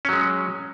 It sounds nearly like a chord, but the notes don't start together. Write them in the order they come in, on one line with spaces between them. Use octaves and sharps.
C#4 F#3 G#3